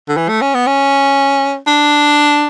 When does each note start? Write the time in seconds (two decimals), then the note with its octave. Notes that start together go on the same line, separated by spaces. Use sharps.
0.09 D3
0.17 E3
0.29 A3
0.42 C#4
0.54 B3
0.67 C#4
1.67 D4